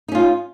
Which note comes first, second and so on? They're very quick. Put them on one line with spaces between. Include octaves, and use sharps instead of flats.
D#4 C#4 F4